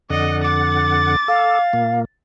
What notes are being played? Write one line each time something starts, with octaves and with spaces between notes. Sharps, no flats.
F2 D3 D5 D#5 F#5
D6 A6
A4 F5
A#2 A#3